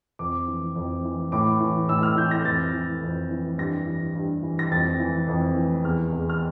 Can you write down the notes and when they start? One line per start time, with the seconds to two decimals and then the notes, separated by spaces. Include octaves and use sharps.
0.19 F2 D6
0.48 E3
0.76 F2
1.05 E3
1.32 A2 D6
1.60 E3
1.89 A2 E6
2.03 F6
2.17 E3 G6
2.31 A#6
2.45 F2 A6
2.74 E3
3.02 F2
3.31 E3
3.58 G2 A#6
3.87 E3
4.15 G2
4.43 E3
4.59 A#6
4.71 F2 A6
5.00 E3
5.28 F2
5.56 E3
5.84 E2 F6
6.13 E2
6.30 F6